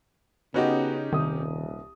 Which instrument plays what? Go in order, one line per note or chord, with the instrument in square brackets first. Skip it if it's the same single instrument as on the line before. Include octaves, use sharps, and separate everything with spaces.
[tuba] C#3 [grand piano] B3 F#4 D#5 [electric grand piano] C#4 D#4 G4
[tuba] D#1 [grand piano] C2 D#6 [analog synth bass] D#3